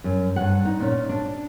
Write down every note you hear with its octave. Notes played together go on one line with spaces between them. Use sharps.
F#2
G2 F#5
D#4
A#2 C#4 D#4
D4